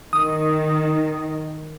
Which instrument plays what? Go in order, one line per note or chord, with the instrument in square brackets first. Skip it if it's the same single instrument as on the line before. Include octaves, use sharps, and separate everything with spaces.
[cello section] D#3 [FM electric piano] D#6